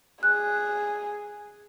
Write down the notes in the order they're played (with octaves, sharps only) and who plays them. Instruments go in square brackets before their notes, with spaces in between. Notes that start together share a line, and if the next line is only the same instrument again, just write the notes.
[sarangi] G#4 [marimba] F#6